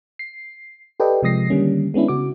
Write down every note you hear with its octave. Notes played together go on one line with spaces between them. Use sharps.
C7
G4 A4 B4 D5 D#5 G5
C3 F3 G#3 D#6 A#6 C7
D3 D#3 G3 A#3 C#4
G#3 B3 C#4 D4 E4
C#3 F#4 D6